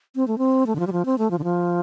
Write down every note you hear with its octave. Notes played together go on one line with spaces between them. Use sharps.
C4
A3
C4
A3
D3
F3
G3
F3
C4
A3
F3
D3
F3